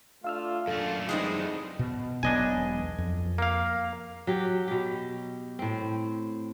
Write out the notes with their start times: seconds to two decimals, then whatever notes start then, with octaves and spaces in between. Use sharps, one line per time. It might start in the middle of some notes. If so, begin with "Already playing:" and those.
0.24 A3 D4 F4 F5 E6 F6
0.67 F#2 A#2 A3 D4 F4 A4
1.09 D3 E3 G3 G#3 C4 D#4
1.79 B2
2.23 E1 B1 B3 D4 D#5 G#5
2.98 F2
3.38 A#3 F5
4.27 F#3 G4
4.68 B2 G4
5.59 A2 C4